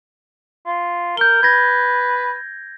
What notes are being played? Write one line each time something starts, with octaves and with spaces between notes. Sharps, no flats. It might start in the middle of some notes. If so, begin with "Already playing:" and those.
F4
A#4 G6 G7
B4 G#6 A#6